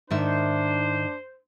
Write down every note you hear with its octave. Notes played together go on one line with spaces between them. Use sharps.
G#2 D#3 D4 C5 E5